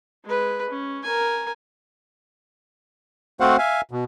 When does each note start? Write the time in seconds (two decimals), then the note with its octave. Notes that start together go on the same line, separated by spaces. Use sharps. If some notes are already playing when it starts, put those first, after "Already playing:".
0.25 G#3 B4
0.69 C#4
1.03 A#4 G#5
3.40 A3 C4 F#4 C5 F5 F#5
3.58 E5 F5 G#5
3.91 B2